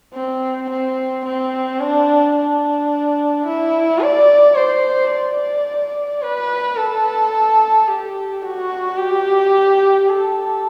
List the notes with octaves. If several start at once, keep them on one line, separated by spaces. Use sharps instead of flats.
C4
C4
C4
D4
D4
E4
D5
C5
D5
B4
A4
G4
F#4
G4
A4